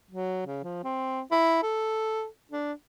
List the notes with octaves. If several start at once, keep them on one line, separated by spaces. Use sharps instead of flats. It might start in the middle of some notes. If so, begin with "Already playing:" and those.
F#3
C#3
F3
C4
E4
A4
D4